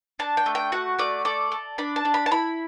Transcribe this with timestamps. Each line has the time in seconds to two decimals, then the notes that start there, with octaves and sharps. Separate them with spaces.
0.19 D4 A5
0.37 G5
0.46 A3
0.55 G5
0.72 F#4 F#5
0.99 A3 D5
1.25 A4 D5
1.52 A4
1.78 D4 B5
1.96 A5
2.05 D4
2.14 B5
2.26 A5
2.31 E4 B5